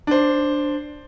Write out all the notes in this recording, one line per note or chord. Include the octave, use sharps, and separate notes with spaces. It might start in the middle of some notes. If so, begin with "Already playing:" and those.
D4 C5